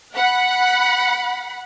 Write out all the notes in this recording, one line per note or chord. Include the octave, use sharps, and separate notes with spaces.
F#5 B5